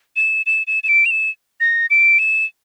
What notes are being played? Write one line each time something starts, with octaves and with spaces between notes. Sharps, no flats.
E7
E7
E7
E7
D7
F7
E7
A#6
D7
E7